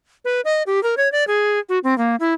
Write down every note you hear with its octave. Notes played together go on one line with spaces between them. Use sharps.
B4
D#5
G4
A#4
C#5
D5
G#4
F#4
C4
A#3
E4